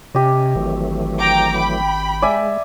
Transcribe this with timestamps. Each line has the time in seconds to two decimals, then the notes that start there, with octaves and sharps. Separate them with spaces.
0.15 C3 C#4 G4 D#5
0.56 G#1 E3 F#3 A3
1.19 G5 A#5 D6
1.57 G5 B5
2.22 G#3 D5 E5 G#5